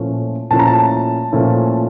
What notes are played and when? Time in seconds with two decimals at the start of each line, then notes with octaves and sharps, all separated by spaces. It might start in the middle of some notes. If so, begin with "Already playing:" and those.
Already playing: A#2 F3 A3 C#4 E4
0.51 A#2 F3 A3 C#4 E4 A5
0.59 A#5
0.67 A5
1.32 A#2 F3 A3 C#4 E4